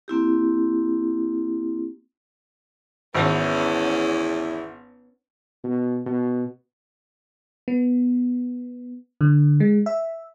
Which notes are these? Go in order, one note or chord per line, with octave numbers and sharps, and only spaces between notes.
A#3 C4 E4 G4
G#1 E2 B3 C#4 E4
B2
B2
B3
D3
G#3
E5